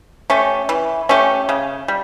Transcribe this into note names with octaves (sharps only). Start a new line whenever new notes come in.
A3 C#4 G4
E3
A3 C#4 G4
C#3
G3